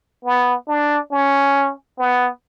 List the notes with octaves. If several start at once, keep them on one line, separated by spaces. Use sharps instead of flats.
B3
D4
C#4
B3